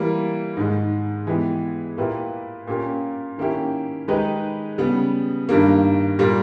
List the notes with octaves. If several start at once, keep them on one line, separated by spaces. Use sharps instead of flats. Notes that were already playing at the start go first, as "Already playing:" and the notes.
Already playing: E3 G3 A#3
G#2 D#3 G#3
E3 G#3 B3 G4
A#2 A#3 E4 G4 B4
A#2 A#3 C#4 G4
D#3 A#3 C#4 E4 G4
D#3 G#3 D#4 G4 B4
C#3 G3 B3
G2 D#3 G3 A#3
A#2 G3 A#3